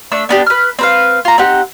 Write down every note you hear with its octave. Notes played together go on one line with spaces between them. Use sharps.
A3 D4 E6
B3 D4 G4
B4 F6
C4 B4 F5
F4 A#5
C4 D#4 G4 F#5